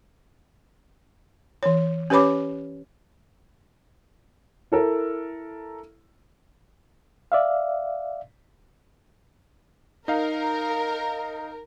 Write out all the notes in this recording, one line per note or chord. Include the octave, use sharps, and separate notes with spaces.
E3 C#5
C#4 G4 B4 C#5 B5 D6
E4 A4 A#4
D5 E5 F5
D#4 A#4 F5